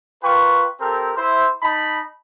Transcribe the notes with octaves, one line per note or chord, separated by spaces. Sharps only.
F4 A#4 B4 G5 C#6
C4 G4 A4 A#4
E4 C5
D#4 A5 B5